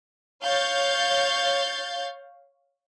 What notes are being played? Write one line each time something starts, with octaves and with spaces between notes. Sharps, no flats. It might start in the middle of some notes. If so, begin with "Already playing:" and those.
C#5 F5 G6 A6